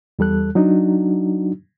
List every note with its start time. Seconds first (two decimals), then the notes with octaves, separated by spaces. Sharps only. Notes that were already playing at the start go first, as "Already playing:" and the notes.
0.19 E2 G3 A4 F#6
0.55 F#3 D4 D#4 F#4